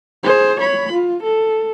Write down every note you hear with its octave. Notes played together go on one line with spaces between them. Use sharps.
G#4 C5
C#5 B5
F4
A4